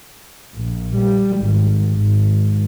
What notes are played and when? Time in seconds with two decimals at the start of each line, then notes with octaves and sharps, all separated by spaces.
0.55 A#1
0.96 G3
1.38 G#1
1.95 G#1